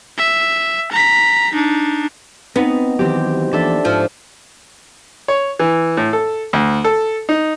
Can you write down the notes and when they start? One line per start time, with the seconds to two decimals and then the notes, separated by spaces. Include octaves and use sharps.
0.18 E5
0.92 A#5 B6
1.53 D4 D#4
2.56 B3 C4 D#4
2.99 D#3 E3 F#3 C4 G4
3.53 E3 F3 A#3 D4 A4 E5
3.85 G#2 F3
5.28 C#5
5.59 E3
5.97 A2
6.13 A4
6.53 D2
6.84 A4
7.29 D#4